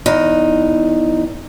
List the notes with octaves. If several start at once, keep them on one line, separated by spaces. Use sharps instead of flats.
E2 D#4